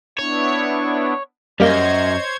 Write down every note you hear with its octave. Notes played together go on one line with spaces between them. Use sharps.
B3 D4 E4 C#5
F#2 G3 A#3 C5 C#5 D#5 G6 G#6